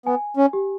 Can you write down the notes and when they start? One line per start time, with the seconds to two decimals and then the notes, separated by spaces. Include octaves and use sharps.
0.06 B3 G#5
0.37 C#4
0.53 G4